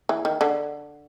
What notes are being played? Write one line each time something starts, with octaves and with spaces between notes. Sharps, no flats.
E3
D#3
D3